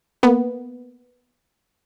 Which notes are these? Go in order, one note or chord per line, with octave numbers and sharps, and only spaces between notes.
A#3 B3